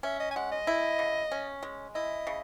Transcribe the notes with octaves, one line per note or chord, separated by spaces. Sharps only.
C#4 E5
D#5
G#5
G#3 F#5
D#5
E4
C#3
C#4
G#3
E4 D#5
C#3